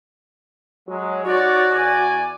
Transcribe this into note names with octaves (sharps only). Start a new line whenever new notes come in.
F#3 G#3
D#4 F#4 C#5 D5
E2 D5 G#5